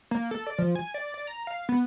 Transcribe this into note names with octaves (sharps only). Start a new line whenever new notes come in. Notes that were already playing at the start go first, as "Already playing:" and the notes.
A#3
A4
D5
F3
G#5
D5
D5
A#5
F5
B3